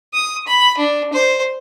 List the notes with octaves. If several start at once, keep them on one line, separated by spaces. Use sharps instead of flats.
D#6
B5
D4
C5